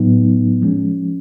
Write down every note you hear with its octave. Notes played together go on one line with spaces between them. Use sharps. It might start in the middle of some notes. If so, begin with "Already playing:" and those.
Already playing: A2 F#3 B3 D#4
F3 G#3 C#4